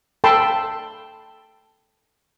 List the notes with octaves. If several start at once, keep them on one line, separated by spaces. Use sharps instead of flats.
A4 G5 A5 B5 C6